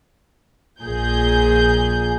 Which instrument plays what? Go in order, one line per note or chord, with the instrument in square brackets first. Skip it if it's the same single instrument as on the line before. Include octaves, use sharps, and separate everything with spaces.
[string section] A#1 A#2 G#4 G6